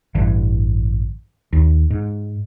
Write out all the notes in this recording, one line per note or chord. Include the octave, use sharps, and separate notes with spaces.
A1 G2 D3 E3
D#2
G#2